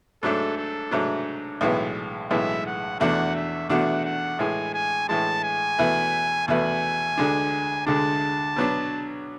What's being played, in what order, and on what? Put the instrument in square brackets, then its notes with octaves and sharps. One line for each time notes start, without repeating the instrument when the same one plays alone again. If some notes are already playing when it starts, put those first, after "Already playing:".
[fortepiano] G#2 F#3 A3 D4 [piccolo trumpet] A4
[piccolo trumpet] A4
[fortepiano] G#2 F#3 A3 D4
B1 A2 E3 G#3 B3
[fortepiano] B1 A2 E3 G#3 B3 [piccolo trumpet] E5
[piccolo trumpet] F#5
[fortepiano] E2 B2 A3 D4 F#4 [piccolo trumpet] F#5
[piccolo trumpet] E5
[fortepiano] E2 B2 A3 D4 F#4 [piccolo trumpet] F#5
[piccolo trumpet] F#5
[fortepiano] A2 E3 G#3 [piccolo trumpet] G#5
[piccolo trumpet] G#5
[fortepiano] A2 E3 G#3 [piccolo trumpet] A5
[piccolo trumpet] G#5
[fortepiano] E2 B2 A3 E4 B4
[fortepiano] E2 B2 A3 E4 B4 [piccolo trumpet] G#5
[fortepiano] D2 D3 G#3 D4
[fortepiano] D2 D3 G#3 D4 [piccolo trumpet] A5
[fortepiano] B2 F#3 B3 D4